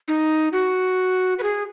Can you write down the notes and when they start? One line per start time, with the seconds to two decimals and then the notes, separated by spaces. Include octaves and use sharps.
0.08 D#4
0.53 F#4
1.39 B4
1.43 G#4